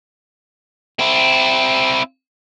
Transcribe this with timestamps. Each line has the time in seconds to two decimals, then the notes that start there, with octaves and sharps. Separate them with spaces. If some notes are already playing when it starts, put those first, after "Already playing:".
1.00 C4 E4